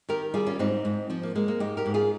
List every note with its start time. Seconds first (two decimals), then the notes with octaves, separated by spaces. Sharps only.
0.09 D#3 G4 A#4
0.34 G3 F4 G#4
0.47 C#4 F4
0.59 G#2 C4 D#4
0.85 G#2
1.10 F3 C4
1.23 A#3
1.35 G#3 A#3
1.48 A#3
1.60 G#2 D#4 G4
1.77 G4 A#4
1.86 G#2
1.94 F4 G#4